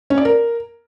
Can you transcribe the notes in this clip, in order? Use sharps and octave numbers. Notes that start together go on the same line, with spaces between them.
C#4
D5
A#4